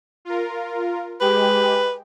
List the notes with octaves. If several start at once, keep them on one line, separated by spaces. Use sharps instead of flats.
F4 A#4
G#3 G4 B4